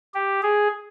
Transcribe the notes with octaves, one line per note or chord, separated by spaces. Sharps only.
G4
G#4